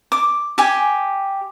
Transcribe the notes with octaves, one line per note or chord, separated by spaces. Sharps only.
D6
G4 G#5